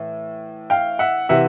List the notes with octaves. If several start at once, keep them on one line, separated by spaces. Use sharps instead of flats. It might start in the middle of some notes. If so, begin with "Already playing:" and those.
Already playing: A2 E3
F5 G5
E5 F#5
C3 E3 E5 F#5